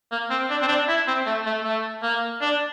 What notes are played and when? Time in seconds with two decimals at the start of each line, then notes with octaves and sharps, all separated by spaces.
0.12 A#3
0.31 C4
0.50 D4
0.61 C4
0.68 D4
0.88 E4
1.07 C4
1.26 A3
1.46 A3
1.64 A3
2.03 A#3
2.41 D4